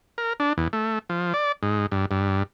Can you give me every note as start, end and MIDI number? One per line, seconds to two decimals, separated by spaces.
0.18 0.33 70
0.40 0.53 62
0.58 0.68 40
0.73 0.99 57
1.10 1.33 53
1.34 1.52 74
1.63 1.86 44
1.92 2.06 43
2.11 2.43 43